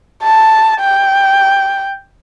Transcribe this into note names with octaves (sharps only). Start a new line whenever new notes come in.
A5
G5